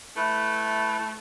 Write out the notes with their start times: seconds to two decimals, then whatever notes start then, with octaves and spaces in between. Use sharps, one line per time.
0.17 A3 E4 B4